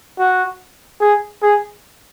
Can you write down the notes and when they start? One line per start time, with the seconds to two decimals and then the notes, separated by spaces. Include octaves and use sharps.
0.19 F#4
1.01 G#4
1.42 G#4